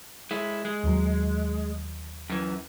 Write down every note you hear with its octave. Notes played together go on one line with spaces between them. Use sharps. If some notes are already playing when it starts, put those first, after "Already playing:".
G#3 E4
G#3
D#2 F#3
F#2 E3